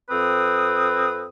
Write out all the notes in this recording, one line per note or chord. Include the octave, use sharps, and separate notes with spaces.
F2 C4 B4 D#6